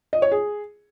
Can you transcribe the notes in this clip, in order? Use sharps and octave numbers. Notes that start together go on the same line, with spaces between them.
D#5
C#5
G#4